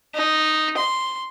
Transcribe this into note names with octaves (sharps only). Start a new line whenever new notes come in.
D#4
C6